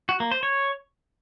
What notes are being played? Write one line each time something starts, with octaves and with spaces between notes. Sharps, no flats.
F#4
A#3
C5
C#5